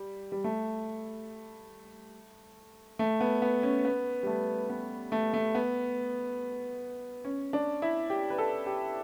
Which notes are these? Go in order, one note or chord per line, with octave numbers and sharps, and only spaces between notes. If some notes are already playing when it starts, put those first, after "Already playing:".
Already playing: G3
G3
A3
A3
B3
B3
C#4
B3
G3
A3
B3
A3
A3
B3
C#4
D4
E4
G4
B4
A4
G4